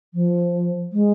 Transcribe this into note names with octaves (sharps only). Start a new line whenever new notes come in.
F3
G#3